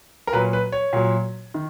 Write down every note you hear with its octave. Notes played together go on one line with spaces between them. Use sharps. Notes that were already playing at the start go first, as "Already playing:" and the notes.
A#4
A#2 F#3 B4
B4
C#5
A#2 F#3
D#3